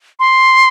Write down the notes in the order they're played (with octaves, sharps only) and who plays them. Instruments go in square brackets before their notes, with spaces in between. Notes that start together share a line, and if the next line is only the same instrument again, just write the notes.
[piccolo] C6